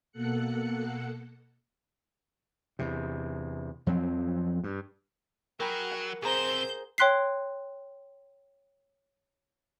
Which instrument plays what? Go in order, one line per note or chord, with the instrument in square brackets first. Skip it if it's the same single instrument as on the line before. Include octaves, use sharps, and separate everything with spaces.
[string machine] B2 A#3 A4 F#5 F#6 C#7
[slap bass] E2 C3
F2 F3 F#3 C4
G2
[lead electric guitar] F#3 [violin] G#4 [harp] A#4 G5 B5
[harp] F#5
[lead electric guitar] B1 C4 [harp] G#4 A#5 [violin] C5 G6
[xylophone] C#5 G5 C6 F#6 B6 C7